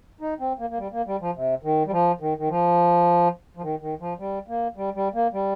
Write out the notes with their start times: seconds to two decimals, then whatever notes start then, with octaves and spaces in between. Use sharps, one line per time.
0.21 D#4
0.40 C4
0.59 A#3
0.70 A#3
0.78 G3
0.92 A#3
1.07 G3
1.21 F3
1.35 C3
1.63 D#3
1.86 G3
1.92 F3
2.20 D#3
2.38 D#3
2.49 F3
3.56 F3
3.62 D#3
3.81 D#3
4.00 F3
4.19 G3
4.48 A#3
4.76 G3
4.95 G3
5.14 A#3
5.33 G3